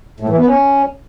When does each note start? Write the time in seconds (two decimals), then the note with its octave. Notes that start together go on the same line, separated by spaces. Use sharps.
0.20 A2
0.29 E3
0.38 B3
0.47 C#4